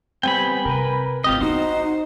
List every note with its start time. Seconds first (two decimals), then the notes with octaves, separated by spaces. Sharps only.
0.23 G3 B3 C4 G5 G#5 B5
0.65 C3 A#4 B4
1.24 G#1 G#2 C4 F4 G4 D#5
1.40 B3 D#4 E4 F#4 C5